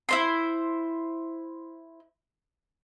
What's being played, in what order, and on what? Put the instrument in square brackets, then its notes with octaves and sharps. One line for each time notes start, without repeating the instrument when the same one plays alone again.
[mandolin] E4 C5 C6